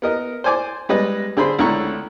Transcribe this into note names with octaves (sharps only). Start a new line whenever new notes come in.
B3 A#4 D#5
C5 D5 G#5 D6
G3 G#3 B4 D#5
D3 G#4 C5 B5 C6
C#2 D3 A3 E4 A#5 C#6